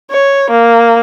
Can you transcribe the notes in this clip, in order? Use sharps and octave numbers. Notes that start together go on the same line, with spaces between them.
C#5
A#3